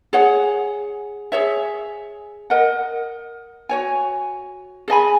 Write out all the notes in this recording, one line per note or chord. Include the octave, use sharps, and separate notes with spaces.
G#4 C#5 F#5
G#4 C#5 E5
A#4 D#5 F#5
F#4 C#5 G#5
G#4 D#5 G#5 B5